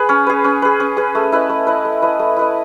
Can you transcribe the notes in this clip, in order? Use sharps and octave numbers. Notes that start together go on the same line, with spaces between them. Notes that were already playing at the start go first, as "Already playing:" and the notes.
Already playing: G#4 B4
C#4
G#4 B4
C#4
G#4 B4
C#4
G#4 B4
A3
E4 B4 D#5
A3
E4 B4 D#5
A3
E4 B4 D#5
A3
E4 B4 D#5